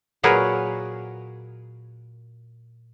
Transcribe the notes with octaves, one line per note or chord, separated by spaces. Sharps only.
A#2 F#3 G#4 A#4 B4 C#5